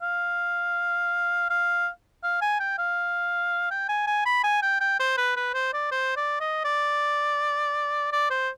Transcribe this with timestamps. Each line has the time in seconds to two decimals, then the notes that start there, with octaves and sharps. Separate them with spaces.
0.02 F5
1.50 F5
2.24 F5
2.42 G#5
2.60 G5
2.78 F5
3.71 G5
3.89 G#5
4.07 G#5
4.26 B5
4.44 G#5
4.62 G5
4.81 G5
5.00 C5
5.17 B4
5.37 B4
5.54 C5
5.73 D5
5.92 C5
6.17 D5
6.41 D#5
6.65 D5
8.12 D5
8.30 C5